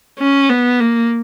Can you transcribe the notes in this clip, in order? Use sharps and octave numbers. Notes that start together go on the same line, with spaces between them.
C#4
B3
A#3